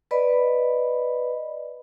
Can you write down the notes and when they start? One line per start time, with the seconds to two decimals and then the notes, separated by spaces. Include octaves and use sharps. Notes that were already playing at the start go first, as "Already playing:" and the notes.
0.11 B4 D5 D#5 B5